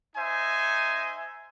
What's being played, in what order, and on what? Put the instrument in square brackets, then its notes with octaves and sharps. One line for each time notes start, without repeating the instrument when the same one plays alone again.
[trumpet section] D#4 C5 E5 G#5